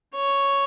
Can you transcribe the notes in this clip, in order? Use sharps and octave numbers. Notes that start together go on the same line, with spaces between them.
C#5